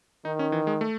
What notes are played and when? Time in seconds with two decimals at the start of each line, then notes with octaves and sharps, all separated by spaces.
0.25 D#3 D#4
0.39 C#4
0.52 E3
0.67 G#3
0.81 A3